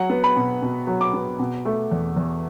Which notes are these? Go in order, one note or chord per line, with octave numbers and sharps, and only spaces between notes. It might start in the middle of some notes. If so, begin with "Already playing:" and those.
Already playing: F#3 F#5
B3
B5
B2
B2
F#3
D6
B3
B2
A3
E2
E2